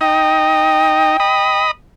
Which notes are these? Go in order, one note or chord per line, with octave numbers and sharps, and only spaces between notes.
D#4 D#5 G5
D#5 B5 D#6